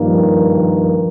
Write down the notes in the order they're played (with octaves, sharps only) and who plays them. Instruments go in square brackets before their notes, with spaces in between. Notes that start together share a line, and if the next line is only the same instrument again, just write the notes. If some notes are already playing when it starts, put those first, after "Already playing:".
Already playing: [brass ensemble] G2 D#3 A#3 [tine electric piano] F3